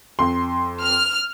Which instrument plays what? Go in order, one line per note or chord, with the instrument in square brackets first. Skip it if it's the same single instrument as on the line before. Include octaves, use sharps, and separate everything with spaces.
[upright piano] F2 C6
[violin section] F6